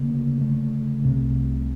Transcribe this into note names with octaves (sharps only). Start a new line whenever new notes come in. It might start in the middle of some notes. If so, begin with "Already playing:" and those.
Already playing: D2 C#3 A#3
A3
C2 C3